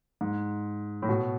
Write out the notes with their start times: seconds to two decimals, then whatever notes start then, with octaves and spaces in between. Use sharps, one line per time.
0.21 G#2
1.02 A2
1.09 B2